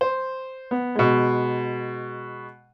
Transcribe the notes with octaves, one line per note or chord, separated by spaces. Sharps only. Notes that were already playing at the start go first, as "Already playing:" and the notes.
C5
B3
B2 G#3